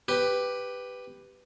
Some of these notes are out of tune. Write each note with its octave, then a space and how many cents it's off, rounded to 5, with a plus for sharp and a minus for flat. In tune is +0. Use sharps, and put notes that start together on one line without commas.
G4 +5 B4 +5